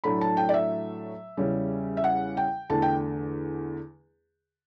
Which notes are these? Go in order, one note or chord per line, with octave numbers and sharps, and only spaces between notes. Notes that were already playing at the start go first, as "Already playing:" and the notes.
A2 F#3 A3 D4 B5
A5
G5
D5
E5
E2 C#3 G3 C#4
E5
F#5
G5
E2 D3 A3 A5
G5